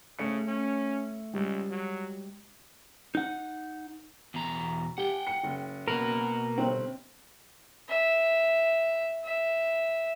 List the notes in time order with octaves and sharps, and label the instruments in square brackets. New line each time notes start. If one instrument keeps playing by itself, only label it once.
[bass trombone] C#3 [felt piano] A3 C#7
[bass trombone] C#4
[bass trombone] C#2 [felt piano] G3 G#3
[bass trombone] F#3
[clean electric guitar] D#4 F#5
E2 B2 A#5
[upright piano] G4 [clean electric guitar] F#5 G5
[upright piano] C#7
F#1
[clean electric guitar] B2 F#4 B4 [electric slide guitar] A#3 A#4
[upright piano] G1 C4
[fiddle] E5
E5